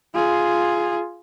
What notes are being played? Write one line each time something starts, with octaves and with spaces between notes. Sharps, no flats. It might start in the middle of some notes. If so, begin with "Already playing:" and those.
F4 G#4